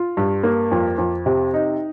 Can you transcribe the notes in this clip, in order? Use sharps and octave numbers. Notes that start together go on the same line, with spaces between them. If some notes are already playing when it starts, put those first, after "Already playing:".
Already playing: F4
G2
A#3
F2
F2
C3
D#4